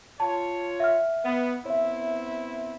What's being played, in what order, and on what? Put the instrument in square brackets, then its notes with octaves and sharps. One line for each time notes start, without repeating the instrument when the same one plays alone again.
[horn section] F4 C#5 [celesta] A5
[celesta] E5 F#5 F6
[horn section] B3
[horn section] B3 C4 E4 [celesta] C#5 E5